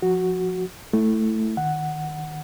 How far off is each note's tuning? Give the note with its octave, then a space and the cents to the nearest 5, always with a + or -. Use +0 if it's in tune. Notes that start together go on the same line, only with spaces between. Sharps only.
F3 +20 F#4 +0
A3 +0 E4 +0
D#3 -5 F#5 +0